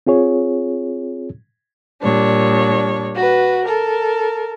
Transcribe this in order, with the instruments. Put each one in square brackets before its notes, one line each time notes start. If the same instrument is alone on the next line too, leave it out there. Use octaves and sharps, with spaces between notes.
[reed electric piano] C4 F4 G#4 C#5
[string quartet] A#2 G3 D4 C#5
F#4 B4
A4 A#4